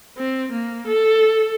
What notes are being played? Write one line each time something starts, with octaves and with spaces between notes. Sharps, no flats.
C4
A#3
A4